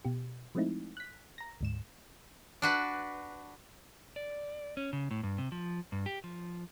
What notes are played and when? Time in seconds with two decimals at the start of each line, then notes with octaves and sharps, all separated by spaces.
0.05 B2 G4
0.55 F3 G#3 A3 C4 D#4 E4
0.97 F#6 B6
1.38 A#5 A#6
1.61 D2 G#2 E7
2.62 D4 F#4 B4
4.16 D5
4.77 C#4
4.93 C#3
5.11 A2
5.23 G2
5.38 C3
5.52 F3
5.92 G2
6.06 G4
6.24 F3